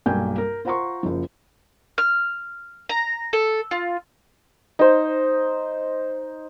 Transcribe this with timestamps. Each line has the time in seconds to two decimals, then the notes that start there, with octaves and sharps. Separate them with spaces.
0.06 B1 G2 A#3 G5 G#5 G6
0.38 A#4
0.65 F4 C5 F#5 A#5 C6 C#6
1.03 F#1 F3
1.98 F6
2.89 A#5
3.33 A4
3.71 F4
4.79 D#4 C5